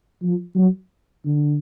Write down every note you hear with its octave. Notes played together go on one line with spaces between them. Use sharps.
F3
F#3
D3